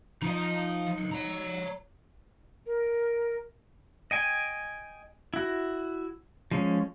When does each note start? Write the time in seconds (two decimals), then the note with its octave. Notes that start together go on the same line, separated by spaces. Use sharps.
0.22 F3 D#4 D#5
1.11 C#5 A#5
2.66 A#4
4.11 D#5 G5 G#5
5.34 E4 F#4
6.51 F3 G#3 C#4